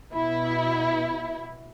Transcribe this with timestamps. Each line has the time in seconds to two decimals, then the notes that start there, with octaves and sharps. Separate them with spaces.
0.13 B2 E4